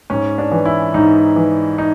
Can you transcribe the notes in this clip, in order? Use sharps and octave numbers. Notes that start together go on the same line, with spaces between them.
G#2 C#4
D4
E3
E4
G#2 D#4
E3
D#4